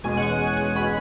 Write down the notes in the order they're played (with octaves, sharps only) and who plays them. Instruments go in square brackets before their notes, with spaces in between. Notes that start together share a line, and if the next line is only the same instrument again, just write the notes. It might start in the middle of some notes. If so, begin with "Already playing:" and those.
[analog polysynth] E2 B2 G#3 C#4 G#5
F#5
G#5
G#5
B2 G#3 C#4 B5